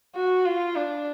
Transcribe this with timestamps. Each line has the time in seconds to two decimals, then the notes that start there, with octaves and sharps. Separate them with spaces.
0.16 F#4
0.46 F4
0.76 D4